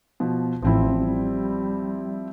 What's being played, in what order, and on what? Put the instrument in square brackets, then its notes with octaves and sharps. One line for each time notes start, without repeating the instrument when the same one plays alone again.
[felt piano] B2 F3
[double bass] A1 [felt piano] F3 C4 E4
[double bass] G3